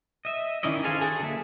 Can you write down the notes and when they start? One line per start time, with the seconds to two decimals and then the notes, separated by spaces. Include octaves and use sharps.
0.25 D#5 E5
0.63 D#3 C#4 E4 D5 D#5
0.84 G#4 A4 C5 F5 G#5
1.01 F#4 G#4 A4 G#5
1.20 D3 F#3 A#3 E5